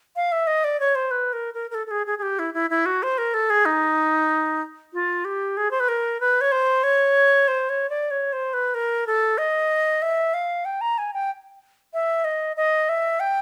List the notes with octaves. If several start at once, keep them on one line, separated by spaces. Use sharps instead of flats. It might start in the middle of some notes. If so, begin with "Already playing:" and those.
F5
E5
D#5
D5
C#5
C5
B4
A#4
A#4
A#4
A4
A4
G#4
G#4
G#4
G4
E4
E4
E4
F#4
C5
A#4
A4
G#4
D#4
F4
G4
G#4
C5
B4
A#4
B4
C#5
C5
C#5
C5
C#5
D5
C#5
C5
B4
A#4
A4
D#5
E5
F5
G5
A#5
G#5
G5
E5
D#5
D#5
E5
G5